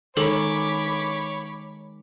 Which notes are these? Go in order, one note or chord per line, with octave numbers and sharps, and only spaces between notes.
D#3 G#3 A4 C#5 B5 D6